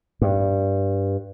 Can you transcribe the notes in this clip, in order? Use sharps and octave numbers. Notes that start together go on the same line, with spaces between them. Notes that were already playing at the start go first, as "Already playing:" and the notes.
G2